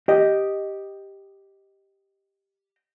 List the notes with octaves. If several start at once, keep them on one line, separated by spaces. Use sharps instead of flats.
G4 D#5